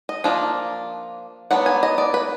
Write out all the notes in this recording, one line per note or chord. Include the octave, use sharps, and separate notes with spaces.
D#5
F3 A#3 D4
F#3 B3 D4 F#5
G#5
D#5
D5
B4